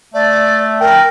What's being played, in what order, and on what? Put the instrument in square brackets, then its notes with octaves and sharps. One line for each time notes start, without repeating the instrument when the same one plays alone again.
[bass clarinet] A3 [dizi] D5
[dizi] A#4 [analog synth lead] G5